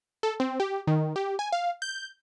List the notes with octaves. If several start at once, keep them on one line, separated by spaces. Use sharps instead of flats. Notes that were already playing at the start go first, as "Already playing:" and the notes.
A4
C4
G4
D#3
G4
G#5
F5
G6